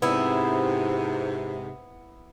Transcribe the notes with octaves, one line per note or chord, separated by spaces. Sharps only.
G#2 C3 B3 E4